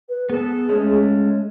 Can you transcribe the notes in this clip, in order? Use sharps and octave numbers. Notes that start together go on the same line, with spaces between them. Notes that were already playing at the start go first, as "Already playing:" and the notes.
B4
B3 G#4 A4
G#3 A3 C#4